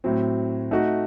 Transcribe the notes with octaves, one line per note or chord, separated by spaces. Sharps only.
A2 F#3 C4
A3 D#4 F#4